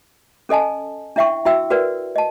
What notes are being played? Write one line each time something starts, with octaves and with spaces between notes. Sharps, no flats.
C#4 A4 D#5 G#5 A5
D4 E4 E5 F#5 G5 C#6
E4 F#4 E5 G5 E6
F#4 A#4 B4 D5 F#5
D#5 A5